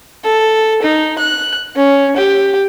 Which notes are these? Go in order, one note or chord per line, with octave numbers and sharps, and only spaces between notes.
A4
D#4
F#6
C#4
G4